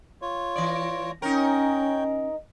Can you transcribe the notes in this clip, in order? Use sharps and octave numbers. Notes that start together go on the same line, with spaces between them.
F4 C#5
E3 D5
C#4 D#4 A#4 C#5 G5